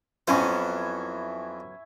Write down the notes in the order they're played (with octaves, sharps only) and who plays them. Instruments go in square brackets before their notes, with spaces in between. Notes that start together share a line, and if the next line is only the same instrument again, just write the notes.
[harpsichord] F2 C5 [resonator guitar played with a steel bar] F#3 B3 C#4 [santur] E4 G#5 C#6